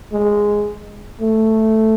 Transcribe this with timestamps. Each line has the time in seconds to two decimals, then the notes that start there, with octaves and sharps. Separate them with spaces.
0.12 G#3
1.21 A3